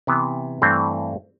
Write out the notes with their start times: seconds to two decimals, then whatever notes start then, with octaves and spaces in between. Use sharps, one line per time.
0.07 C3 E3 B3
0.62 G2 E3 A3 C4